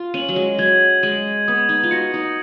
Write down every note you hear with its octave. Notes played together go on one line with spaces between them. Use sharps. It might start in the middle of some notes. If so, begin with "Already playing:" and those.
Already playing: F4
C#4 D#7 F#7
F#3
G#3
F#3 G#6
G#3 D#7 F#7
B3 D#6
D#4
F4
F#4 A#6 C#7
D#4